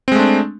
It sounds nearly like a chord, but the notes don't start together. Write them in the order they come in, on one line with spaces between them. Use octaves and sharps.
C4 G#3 A3 D4